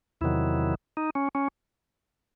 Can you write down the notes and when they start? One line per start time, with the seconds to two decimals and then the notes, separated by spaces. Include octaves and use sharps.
0.21 E2 C3 D#3 F#3 E4
0.97 D#4
1.15 C#4
1.35 C#4